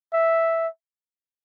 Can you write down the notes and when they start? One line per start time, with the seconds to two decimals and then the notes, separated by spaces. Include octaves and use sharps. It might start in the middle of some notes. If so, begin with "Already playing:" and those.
0.13 E5